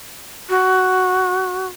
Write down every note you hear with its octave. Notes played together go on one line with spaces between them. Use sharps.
F#4